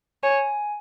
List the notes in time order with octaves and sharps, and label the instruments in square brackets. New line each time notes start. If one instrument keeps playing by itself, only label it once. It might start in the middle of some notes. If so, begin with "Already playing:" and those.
[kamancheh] C#5 [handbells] G#5